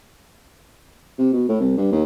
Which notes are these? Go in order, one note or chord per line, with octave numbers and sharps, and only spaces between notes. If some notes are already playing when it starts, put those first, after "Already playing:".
C3
B2
A2
C2
G2
D#2